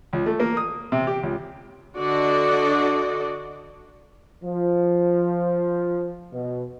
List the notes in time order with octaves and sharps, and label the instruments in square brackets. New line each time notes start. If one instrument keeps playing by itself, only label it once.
[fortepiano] C#2
A3
A#3
D#6
C3
G4
C#2
[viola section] D3 D4 F#4 D5 D#5
[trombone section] F3
B2